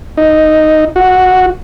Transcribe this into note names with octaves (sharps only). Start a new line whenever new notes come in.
D#4
F#4